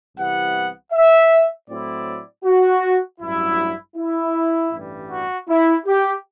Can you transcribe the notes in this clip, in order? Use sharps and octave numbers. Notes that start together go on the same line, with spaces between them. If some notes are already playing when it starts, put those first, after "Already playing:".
C2 C3 E3 B3 F#5
E5
A2 F#3 C4 E4 D5
F#4
A1 G2 F#3 E4
E4
A1 G2 E3 G3
F#4
E4
G4